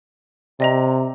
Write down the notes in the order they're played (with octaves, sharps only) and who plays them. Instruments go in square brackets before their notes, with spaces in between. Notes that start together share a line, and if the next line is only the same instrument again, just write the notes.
[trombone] C3 [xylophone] D5 D#5 A#5